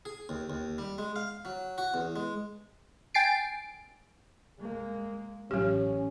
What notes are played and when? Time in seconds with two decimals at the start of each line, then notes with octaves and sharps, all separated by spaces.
0.05 G#4
0.29 D#2
0.50 D#2
0.78 G3
0.98 G#3
1.16 F5
1.45 F#3
1.78 F#4
1.94 E2
2.16 G#3
3.14 G5 G#5 A6 C7 D7
4.60 G#3 A#3
5.51 A1 A2 F#3 C#4 G4